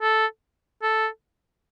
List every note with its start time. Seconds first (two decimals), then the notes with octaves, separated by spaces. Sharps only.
0.02 A4
0.83 A4